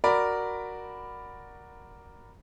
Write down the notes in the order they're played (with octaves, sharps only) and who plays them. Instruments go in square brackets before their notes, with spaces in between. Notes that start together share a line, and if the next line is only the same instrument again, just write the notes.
[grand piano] F#4 A#4 D5 B5